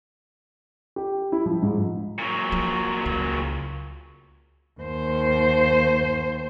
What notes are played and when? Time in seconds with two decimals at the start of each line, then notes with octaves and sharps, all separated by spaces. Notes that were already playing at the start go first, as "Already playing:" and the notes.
0.96 G4
1.32 E4
1.46 F3
1.62 G#2
2.19 A#2 F#3
2.52 F3
3.05 C#2 C#3
4.80 D#2 C5